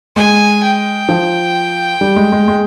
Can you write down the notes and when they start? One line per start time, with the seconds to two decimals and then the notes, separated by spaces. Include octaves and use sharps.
0.16 G#3 G#5
0.63 G5
1.09 F3
2.01 G3
2.16 G#3
2.32 G#3
2.48 G#3